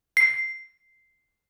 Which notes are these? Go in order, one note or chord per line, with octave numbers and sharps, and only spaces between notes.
C7